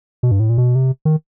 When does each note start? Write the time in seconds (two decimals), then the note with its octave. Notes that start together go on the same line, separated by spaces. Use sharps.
0.23 B2
0.31 G2
0.40 A2
0.50 A#2
0.58 B2
0.75 C3
1.05 D#3